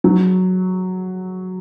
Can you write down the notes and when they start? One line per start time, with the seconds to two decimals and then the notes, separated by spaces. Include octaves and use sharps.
0.04 F#3